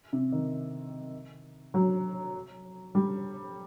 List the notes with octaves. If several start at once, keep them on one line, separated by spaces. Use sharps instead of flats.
C3
D#3
F#3
G3